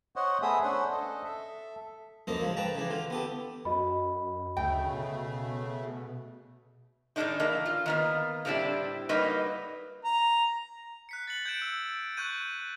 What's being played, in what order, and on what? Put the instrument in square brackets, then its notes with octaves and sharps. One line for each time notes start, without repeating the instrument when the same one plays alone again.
[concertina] C5 C#5 D#5 F#5
A3 B3 G#4 E5 D#6
C#4 D4 C5 F#5
A4 D#5
A4 E5
[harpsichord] F#2 F3 A#3 A4 D#5
G#2 C#3 F3
B4 G5 A5 A#5
C#3 E3 D4
D3 F4
B3 G4 A4
[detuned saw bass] F#2 [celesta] F#4 D#5 B5
[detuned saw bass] D2 [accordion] C#3 A3 [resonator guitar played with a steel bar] G5
[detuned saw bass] B2
[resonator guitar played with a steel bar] A2 D#3 F3 G#3 D4 D#4
E3 A#3
F4
D#3 A#3 B3
A2 G3 A3 C4 D4 E4
F#3 G3 A#3 D#4 B4 D#5
[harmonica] A#5
[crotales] F#6 B6 C#7
A6 C#7 F#7
G6 G#6 C#7 D7 E7
E6
D7
C#6 E6 F#6 G6 D#7 F#7